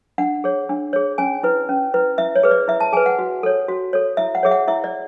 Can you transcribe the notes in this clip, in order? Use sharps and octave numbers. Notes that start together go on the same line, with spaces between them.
D4 F#5
G#4 C#5
D4
G#4 C#5
C#4 G#5
E4 B4
C#4
E4 B4
E4 E5
C#5
G#4 B4
D5
E4 E5
A5
G#4 B4 G#5
F#5
F#4
A4 C#5
F#4
A4 C#5
E4 E5
F#5
G#4 C#5 E5
F#5
E4 E5
D5